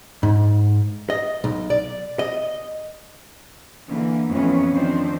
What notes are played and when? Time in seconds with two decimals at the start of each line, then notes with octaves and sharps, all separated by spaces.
0.23 G#2
1.10 D#5
1.44 B1
1.70 D5
2.19 D#5
3.89 D3 E3 A#3
4.32 F2 E3 A3 B3 C#4
4.73 D#3 F3 C4 D4 C5